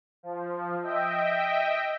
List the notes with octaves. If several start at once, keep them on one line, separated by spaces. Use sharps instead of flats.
F3
D#5 E5 G5